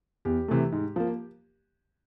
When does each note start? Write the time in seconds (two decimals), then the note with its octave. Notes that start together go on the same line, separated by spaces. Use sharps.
0.25 E2 G4
0.48 C3 E3 A3
0.72 G#2
0.96 F3 A#3